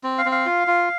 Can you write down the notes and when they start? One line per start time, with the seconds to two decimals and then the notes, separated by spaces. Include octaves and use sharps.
0.04 C4
0.18 F5
0.26 C4
0.32 F5
0.46 F4
0.67 F4